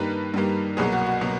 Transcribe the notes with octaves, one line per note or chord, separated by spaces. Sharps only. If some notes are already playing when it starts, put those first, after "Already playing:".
Already playing: G2 D#3 G3 A#3 B4
G2 D#3 G3 A#3
C2 B2 F#3 A#3 G#4
F#4
F#4
B2 F#3 A#3